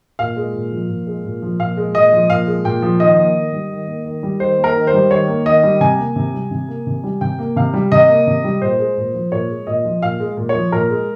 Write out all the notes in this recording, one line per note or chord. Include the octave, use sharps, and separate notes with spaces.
A#2 F5
G#3
A#2
F3
A#2
G#3
A#2
F3
A#2 F5
G#3
A#2 D#5
F3
A#2 F5
G#3
A#2 G5
F3
D#3 D#5
A#3
D#3
G3
D#3
A#3
D#3
G3
D#3 C5
A#3
A#4
D#3
C5
G3
D#3 C#5
A#3
D#3 D#5
G3
C3 G#5
A#3
C3
G3
C3
A#3
C3
G3
C3 G5
A#3
C3 F5
G3
C3 D#5
A#3
C3
G3
A#2 C5
G#3
A#2
F3
A#2 C#5
G#3
A#2 D#5
F3
A#2 F5
G#3
A#2
C#5
F3
A#2 A#4
G#3